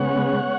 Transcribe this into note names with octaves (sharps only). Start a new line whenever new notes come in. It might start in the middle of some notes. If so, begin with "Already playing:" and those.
Already playing: C#3 G#3 B3 C#5 F#5